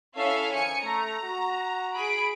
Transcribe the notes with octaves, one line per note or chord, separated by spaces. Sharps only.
C#4 E4 A4 E5 F5
D#3 F3 G#5 C#7
A3 A#5
F#4
G#4 B5 D7